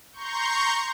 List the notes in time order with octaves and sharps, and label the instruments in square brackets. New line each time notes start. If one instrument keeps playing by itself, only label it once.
[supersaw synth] A#5 C6 C#6 G6